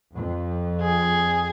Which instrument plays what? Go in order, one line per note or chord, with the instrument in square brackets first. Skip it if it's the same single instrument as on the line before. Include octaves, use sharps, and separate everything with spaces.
[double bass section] F2
[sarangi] G#4